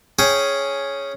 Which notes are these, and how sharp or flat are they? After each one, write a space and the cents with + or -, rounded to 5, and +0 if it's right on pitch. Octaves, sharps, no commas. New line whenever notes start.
C#4 +0 G#4 +5 G5 +0